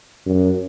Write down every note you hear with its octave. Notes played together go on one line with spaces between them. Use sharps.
F#2